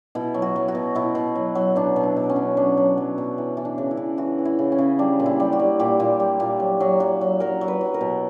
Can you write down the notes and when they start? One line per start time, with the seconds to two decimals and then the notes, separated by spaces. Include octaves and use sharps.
0.15 B2 E4
0.34 F#3
0.42 F#4
0.56 F#3
0.68 F#4
0.75 B2
0.95 B2 E4
1.15 B2
1.35 F#3
1.55 F#3
1.76 B2 D4
1.96 B2
2.03 D4
2.16 B2
2.30 C#4
2.36 F#3
2.57 F#3 D4
2.77 F#3
2.97 F#3
3.18 B2
3.38 E3
3.57 E3
3.65 D4
3.78 C#3
3.91 E4
3.97 E3
4.17 E3 F#4
4.38 E3
4.45 E4
4.59 C#3
4.72 C#4
4.78 C#3
4.99 G3 D4
5.19 A#2
5.26 E4
5.40 G3
5.52 F#4
5.59 G3
5.79 A#2 G4
6.00 A#2
6.20 G3
6.40 A#2
6.60 F#3
6.80 F#3
7.00 F#3
7.21 F#3
7.40 F#3 A#4
7.61 F#3
7.68 B4
7.81 F#3
7.94 A#4
8.01 B2